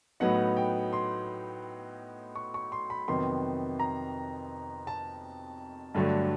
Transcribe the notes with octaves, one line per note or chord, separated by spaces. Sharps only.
A2 F#3 B3 D#4 F#5
G5
C6
C#6
C#6
C6
B5
F2 C3 D#3 F#3 B3 C6
A#5
A5
G2 D3 F#3 A3